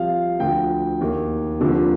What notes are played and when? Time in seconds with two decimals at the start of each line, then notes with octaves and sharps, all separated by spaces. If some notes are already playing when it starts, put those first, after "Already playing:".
Already playing: C2 C3 F3 F5
0.39 D2 D3 F3 G5
1.01 D#2 D#3
1.60 F1 D#2 D3 F3